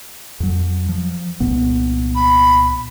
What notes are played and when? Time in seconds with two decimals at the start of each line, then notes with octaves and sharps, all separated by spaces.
0.40 F2 F#3
0.89 F3
1.40 C2 A#2 B3
2.15 B5